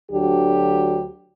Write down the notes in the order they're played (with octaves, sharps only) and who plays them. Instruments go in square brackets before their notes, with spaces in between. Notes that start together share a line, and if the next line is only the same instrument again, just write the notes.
[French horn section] D2 D3 F#3 D4 G4